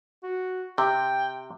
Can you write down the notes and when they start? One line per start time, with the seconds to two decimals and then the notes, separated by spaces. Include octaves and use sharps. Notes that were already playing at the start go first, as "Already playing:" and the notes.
0.23 F#4
0.78 C3 G5